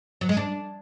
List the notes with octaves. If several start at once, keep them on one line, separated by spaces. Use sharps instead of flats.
F#3
G#3
D4